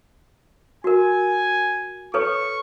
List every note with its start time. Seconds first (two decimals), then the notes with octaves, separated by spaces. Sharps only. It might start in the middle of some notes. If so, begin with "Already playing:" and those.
0.84 F#4 A#4 G#5
2.14 A4 B4 C#5 C#6